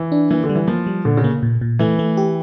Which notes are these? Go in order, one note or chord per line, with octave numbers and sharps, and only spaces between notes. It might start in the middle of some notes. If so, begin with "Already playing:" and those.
Already playing: E3
D4
E3 A#3
D3
G3
E3
F3 A#3
G3
A#2 D3
C#3
A#3
A#2
A#2
E3 A3
A3
G4